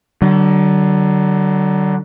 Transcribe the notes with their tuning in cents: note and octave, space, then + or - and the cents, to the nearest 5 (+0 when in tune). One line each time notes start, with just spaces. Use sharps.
D3 +25 F#3 +45